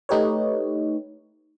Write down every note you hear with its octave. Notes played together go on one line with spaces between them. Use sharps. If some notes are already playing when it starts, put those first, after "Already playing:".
A3 D#4 G4 B4 C#5